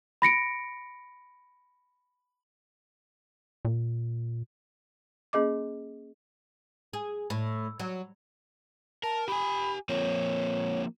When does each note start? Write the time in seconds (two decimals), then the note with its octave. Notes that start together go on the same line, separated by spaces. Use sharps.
0.22 B5 A#6 C#7 D7
3.65 A#2
5.33 A#3 C#4 G#4 D#5 D6
6.93 G#4
7.30 A2
7.80 F#3
9.03 A#4 A5
9.28 G4 G#5 B5
9.89 F3 A#3 C4 C#5